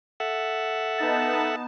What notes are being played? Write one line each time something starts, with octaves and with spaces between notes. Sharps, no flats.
A4 E5 F#5
B3 D#4 A5